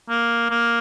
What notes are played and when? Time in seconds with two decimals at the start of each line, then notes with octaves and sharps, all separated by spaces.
0.09 A#3
0.50 A#3